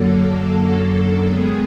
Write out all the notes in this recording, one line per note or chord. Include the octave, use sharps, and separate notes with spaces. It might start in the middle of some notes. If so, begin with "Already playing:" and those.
Already playing: F#2 D3 F#3 A#3 A4
D#3 G#3 B3 G#4